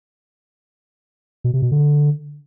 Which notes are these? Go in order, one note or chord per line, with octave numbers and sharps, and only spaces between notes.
B2
C3
B2
D3